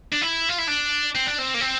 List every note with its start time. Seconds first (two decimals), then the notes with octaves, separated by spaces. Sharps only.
0.13 D4
0.22 E4
0.49 F4
0.59 E4
0.68 D4
1.15 C4
1.27 D4
1.38 C4
1.54 A#3
1.61 C4